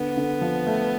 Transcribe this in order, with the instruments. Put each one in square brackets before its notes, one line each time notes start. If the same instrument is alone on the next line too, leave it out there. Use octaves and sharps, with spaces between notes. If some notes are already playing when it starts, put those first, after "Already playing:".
Already playing: [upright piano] D3 [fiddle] B3
[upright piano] D3
F3
A3